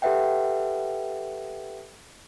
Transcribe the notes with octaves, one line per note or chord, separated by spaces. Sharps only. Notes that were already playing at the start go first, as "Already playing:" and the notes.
G4 A4 B4 E5 F#5 G5